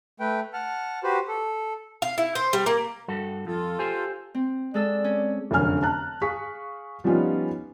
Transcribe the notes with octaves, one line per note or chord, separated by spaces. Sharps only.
A3 B4 G5
F#5 A5 F6
F#4 G4 B4 C5
A4
F5
E4
C5
G3
A#3
G2 F#4 A4
F2 F4 A4
G4 C5 G#5
C4
G#3 A4 D5 E6
C#4
F1 F#2 D3 G#5 F6
A5 A#5 F#6
G#4 F5 C#6 B6
F3 G3 B3 C#4 D#4 F4